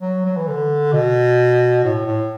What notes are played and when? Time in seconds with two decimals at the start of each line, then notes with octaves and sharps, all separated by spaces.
0.01 F#3
0.25 F#3
0.37 E3
0.47 D3
0.93 B2
1.84 A2
2.06 A2